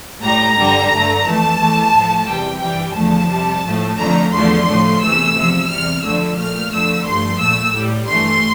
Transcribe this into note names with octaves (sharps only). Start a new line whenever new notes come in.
A2 G3 A#5
G2 D3 G3
G2 D3 A3
F2 E3 A3 A5
E2 E3 A3
A2 F3 A3
E2 C3 E3 G3 G5
G2 E3 G3 G5
E2 D3 F3 A3 A5
F2 C3 G3
A2 F3 A3
F2 D3 F3 A3 A#5
E2 D3 F3 A3 C6
A2 F3 A3
E2 C3 E3 A3 E6
E2 C3 F3
E2 C3 G3 F6
F2 D3 F3 A3 E6
A#2 A3 F6
F2 D3 F3 A3 E6
G2 F3 A3 C6
A#2 A3 E6
A2 G3
G2 E3 A3 C6